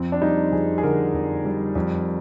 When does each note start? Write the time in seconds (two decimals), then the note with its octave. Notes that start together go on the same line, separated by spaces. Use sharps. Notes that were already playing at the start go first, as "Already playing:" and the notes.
Already playing: F2 C4
0.12 D4
0.21 G3 D#4
0.52 F2 G#4
0.78 G#4
0.83 D3 A#4
1.14 F2
1.45 G3
1.75 F2